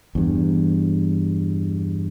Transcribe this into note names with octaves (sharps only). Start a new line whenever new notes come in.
E2 G2